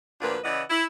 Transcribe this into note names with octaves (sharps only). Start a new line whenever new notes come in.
D2 A#2 F3 D4 F4 B4
C#3 E3 E4 D5 D#5 F#5
E4